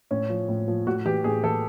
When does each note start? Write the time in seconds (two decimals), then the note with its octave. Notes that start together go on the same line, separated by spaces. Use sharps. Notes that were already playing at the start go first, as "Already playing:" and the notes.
0.11 A2 C#4
0.30 F3
0.49 A2
0.68 F3
0.86 A2 F#4
1.05 E3 G4
1.24 A2 G#4
1.43 E3 A4